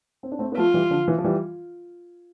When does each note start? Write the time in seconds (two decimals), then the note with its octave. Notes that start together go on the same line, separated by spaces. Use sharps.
0.23 C4
0.31 D4
0.39 A3 C4
0.52 B3
0.57 F3 A3 F4
0.74 E3 G3
0.90 D3 F3
1.08 E3
1.18 F3
1.24 E3 G3